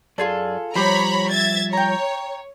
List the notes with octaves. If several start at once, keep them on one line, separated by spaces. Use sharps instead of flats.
F#2 F4 G#4 A4 D5
F3 G3 G4 C5 C#5 A#5 B5
E5 G#6 A6
C#5 G5 A#5